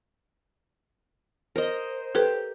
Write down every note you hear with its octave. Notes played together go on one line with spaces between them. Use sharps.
A#4 C5 D#5
G4 A4 B4